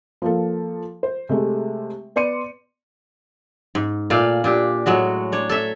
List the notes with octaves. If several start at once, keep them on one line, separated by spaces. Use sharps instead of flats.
F3 A#3 A4
C5
C3 G#3 A3
B3 D5 C6 C#7 D#7
G#2
A#2 A3 D5 F5
A#2 D4 G4
A2 F#3 G#3 F#4
D4 C#5
A4 C#5 E5